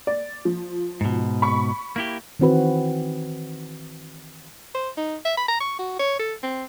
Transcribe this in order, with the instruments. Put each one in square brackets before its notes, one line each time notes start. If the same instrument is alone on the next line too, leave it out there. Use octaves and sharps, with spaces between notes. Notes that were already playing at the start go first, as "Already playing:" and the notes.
[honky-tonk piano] D5
F3
[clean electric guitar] G#2 B2
[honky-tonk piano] B5 C#6
[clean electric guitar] A#3 E4 G4
[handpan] D#3 E3 C4 F#4 B4
[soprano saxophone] C5
D#4
E5
B5
A#5
C#6
F#4
C#5
A4
C4